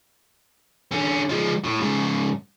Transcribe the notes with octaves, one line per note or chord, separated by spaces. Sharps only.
D3 C#4
F3 G#3
A2
G#2 C#3